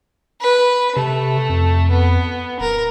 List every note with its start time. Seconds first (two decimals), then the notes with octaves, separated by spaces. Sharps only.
0.41 B4
0.96 C3 A3
1.49 F2
1.90 B3
2.60 D1 A#4